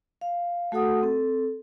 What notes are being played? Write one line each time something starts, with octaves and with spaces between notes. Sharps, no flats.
F5
A3 F#4 A4 F#5 D#6
C4 A4